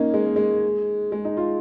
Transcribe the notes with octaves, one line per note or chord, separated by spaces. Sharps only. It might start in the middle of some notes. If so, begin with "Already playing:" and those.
Already playing: A#3 C#4 D#4
G#3
A#3
G#3
G#3
D#4
F4